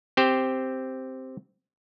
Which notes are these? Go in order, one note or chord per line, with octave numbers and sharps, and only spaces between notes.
C4 G4 C5